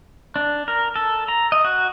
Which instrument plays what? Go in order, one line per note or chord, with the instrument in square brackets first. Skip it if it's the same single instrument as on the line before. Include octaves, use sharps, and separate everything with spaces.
[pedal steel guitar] D4
A#4
A4
A#5
D#5
F#4